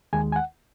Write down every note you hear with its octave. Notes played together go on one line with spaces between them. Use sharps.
D#2 D#3 G#3 G#5
G#5
F#5